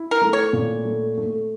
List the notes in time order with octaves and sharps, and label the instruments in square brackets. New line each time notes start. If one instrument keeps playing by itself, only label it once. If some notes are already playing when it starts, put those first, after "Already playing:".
Already playing: [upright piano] E4
[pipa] A#4
[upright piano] A3
[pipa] C#5
[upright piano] A#2
A3
A3